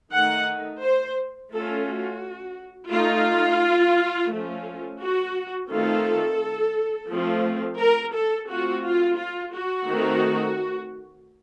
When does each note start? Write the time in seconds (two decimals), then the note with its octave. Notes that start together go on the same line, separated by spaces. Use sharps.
0.13 D#3 A3 D#4 F#5
0.82 C5
1.52 A3 C#4 F4 A4
1.87 F#4
2.91 A3 D#4 F4
4.31 F3 A3 C#4 F4
5.01 F#4
5.70 D#3 A3 C4 F4 A4
7.09 F3 A3 C4 F4
7.79 A#4
8.15 A4
8.49 A3 C4 F4 F#4
8.84 F4
9.18 F4
9.54 F#4
9.89 D#3 A3 C4 D#4